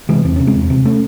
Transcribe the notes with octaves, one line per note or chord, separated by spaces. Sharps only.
C3 E3 G#3
E2 C4
C3 C#4
G#3 C4
E2
C3
A3 C#4